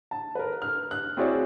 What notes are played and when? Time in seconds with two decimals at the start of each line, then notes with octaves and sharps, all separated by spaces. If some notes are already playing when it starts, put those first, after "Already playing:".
0.11 A5
0.35 A#4 B4
0.62 F6
0.91 F#6
1.17 C4 E4 F#4 G#4 C#5 D5